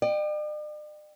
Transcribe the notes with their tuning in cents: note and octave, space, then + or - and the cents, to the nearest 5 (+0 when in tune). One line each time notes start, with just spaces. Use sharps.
D5 +45 G5 +0